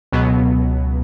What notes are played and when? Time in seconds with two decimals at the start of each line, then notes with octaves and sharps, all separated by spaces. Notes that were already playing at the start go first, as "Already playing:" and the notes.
0.12 C#2 B2 F#3 B3